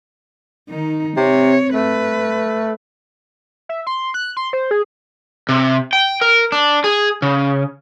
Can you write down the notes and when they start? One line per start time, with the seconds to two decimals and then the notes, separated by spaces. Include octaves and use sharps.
0.69 D#3 D#4
1.17 C3 C4 C#5
1.74 A3 B4
3.69 E5
3.87 C6
4.14 F#6
4.37 C6
4.53 C5
4.71 G#4
5.49 C3
5.93 G5
6.21 A#4
6.52 D4
6.84 G#4
7.22 C#3